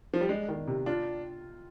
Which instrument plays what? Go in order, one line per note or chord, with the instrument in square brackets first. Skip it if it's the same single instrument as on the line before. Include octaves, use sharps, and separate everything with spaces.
[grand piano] F3
G3
[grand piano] G#3 [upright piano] D4
[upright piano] D#3
C3
[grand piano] D4 [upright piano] F4